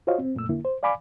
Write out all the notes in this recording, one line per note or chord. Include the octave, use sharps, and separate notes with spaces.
F4 F#4 C5 C#5 D#5 F5
C4
F#2 A#2 A3 E6
F2 D3 A#3 E4
C5
D5 F5 G#5 B5 D6